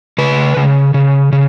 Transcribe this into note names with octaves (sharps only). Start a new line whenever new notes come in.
C#3 B4
C#3
C#3
C#3